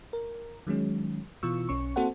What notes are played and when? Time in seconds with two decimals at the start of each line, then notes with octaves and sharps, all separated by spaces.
0.13 A#4
0.67 D#3 F#3 G#3 C#4
1.43 B2 E3 F4 C#6 E6
1.69 B1 C#4 C#6
1.96 A#3 C4 F#4 A4 C5 F#5